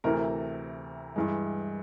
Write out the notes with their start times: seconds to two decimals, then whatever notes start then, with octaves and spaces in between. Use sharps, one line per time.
0.04 D2 C3 E3 A3 A#4
1.16 G2 E3 G#3